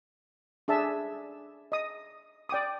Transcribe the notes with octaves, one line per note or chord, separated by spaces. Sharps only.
D4 G#4 E5 A5
D#5 D#6
D5 G5 D6 D#6